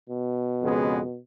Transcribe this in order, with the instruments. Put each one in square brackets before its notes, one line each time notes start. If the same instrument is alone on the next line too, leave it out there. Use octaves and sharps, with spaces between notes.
[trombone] B2
[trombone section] F2 C#3 G#3 B3